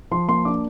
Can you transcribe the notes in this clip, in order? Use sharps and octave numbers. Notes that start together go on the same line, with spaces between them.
F3 C6
A#3 C6
D4 D6